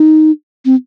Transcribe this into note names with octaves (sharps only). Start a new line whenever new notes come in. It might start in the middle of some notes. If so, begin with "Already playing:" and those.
Already playing: D#4
C4